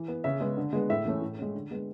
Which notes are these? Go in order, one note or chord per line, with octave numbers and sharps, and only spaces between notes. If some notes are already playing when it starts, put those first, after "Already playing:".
Already playing: E3
B3
C#3 E5
G#3 B3
D3
G#3 B3
A2 E5
E3 A3 C#4
A2
G#3 C#4
D3
G#3 B3